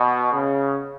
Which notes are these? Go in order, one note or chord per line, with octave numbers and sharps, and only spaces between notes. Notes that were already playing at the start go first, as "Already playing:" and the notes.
Already playing: B2
C#3